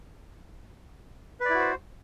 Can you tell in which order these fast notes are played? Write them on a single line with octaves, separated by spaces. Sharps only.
B4 D5 E4 F#4 C5